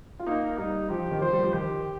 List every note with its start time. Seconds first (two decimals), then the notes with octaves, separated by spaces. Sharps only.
0.20 F4
0.26 A#3 D#4
0.58 G3 D#4
0.90 F3 G4
1.11 D#3
1.21 F3 C5
1.33 G3
1.43 F3
1.53 D#3 G4